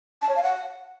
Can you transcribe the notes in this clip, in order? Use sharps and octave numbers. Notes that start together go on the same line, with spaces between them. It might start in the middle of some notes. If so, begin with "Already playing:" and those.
A5
C#5
F5
F#5